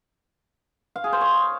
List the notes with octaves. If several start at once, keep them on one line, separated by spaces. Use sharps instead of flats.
F5
G#4
C5
C#5